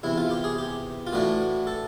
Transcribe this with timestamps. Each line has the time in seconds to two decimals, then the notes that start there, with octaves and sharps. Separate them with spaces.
0.03 E2 C3 E3 E4
0.17 F4
0.30 G4
0.44 G#4
0.58 G4
1.07 F4
1.13 A2 E3 A3 D4 F#4
1.67 A4